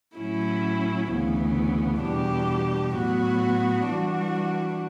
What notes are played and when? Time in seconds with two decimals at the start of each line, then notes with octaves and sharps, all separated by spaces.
0.18 A2 F#3 C#4 E4
1.09 D2 C#3 E3 B3
2.02 E2 B2 G3 D4 G4
2.95 A2 F#3 B3 F#4
3.87 E3 G3 D4 F#4